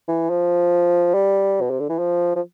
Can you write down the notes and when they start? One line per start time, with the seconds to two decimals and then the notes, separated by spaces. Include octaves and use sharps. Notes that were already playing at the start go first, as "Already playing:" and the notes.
0.08 E3
0.30 F3
1.14 G3
1.61 B2
1.70 C3
1.80 D3
1.89 E3
1.99 F3
2.36 F3